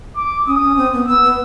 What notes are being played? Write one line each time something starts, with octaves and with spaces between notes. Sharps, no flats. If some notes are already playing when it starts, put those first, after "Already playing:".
D6
C#4 D#6
C#4
C4
B3
B3 E6
B3